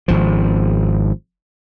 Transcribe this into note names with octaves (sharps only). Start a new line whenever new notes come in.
G#1 F3